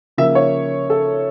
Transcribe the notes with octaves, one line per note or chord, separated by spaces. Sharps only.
C#3 F3 A#3 E5
C#5
A4